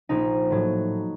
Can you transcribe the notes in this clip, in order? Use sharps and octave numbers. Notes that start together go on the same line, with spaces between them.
A#1 D#4
A2 F#3